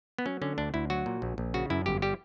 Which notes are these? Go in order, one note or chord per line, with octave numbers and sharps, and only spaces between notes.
B3
F#3 C#4
D3 C#4
D2 D4
D2 E4
F#3 F#4
A#2
A#1
A#1
C#3 F#4
F#2 E4
G1 G4
G3 G4